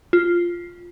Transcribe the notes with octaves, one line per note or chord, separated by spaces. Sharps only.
F4